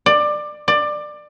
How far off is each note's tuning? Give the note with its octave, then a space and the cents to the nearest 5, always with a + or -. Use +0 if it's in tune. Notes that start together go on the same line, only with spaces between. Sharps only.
D5 +20
D5 +20